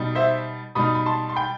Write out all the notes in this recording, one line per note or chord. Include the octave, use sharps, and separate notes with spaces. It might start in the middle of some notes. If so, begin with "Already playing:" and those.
Already playing: B2 G3 D#4
C5 E5
B2 G3 D#4 B5 D#6
B5
A5 C6
C6
G5 B5